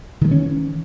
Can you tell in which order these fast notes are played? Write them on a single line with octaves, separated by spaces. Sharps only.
D#3 G#3 E3 C#4